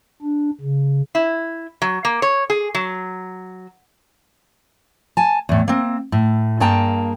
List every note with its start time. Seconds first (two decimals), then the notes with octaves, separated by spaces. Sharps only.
0.22 D4
0.61 C#3
1.15 E4
1.82 F#3
2.05 A#3
2.22 C#5
2.50 G#4
2.75 F#3
5.17 G#5 A5
5.49 E2 A2
5.68 A#3 C4
6.12 A2
6.60 G2 A#3 G#4 G5 A5 A#5